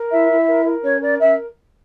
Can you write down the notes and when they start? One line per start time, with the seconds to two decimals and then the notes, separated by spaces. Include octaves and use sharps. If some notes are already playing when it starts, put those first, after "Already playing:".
Already playing: A#4
0.10 E4 E5
0.29 E4
0.47 A#4
0.65 A#4
0.84 C#4 C#5
1.02 A#4 D5
1.20 C#4 E5